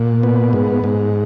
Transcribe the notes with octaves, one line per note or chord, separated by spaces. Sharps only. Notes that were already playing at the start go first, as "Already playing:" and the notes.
Already playing: A#2
B3
G#2
G#2